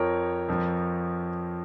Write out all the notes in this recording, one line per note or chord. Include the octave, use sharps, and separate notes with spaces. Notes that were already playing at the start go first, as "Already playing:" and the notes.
Already playing: F2 F3 A#4 C#5
F2 F3